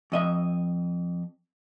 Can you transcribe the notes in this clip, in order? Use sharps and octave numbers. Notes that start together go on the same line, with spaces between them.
F2 D#5 E5